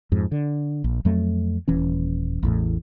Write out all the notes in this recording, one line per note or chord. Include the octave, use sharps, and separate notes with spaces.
F2 G#2
D3
A#1
F2 F#3 A3
D#1 E3 C#4
A1 E2 A2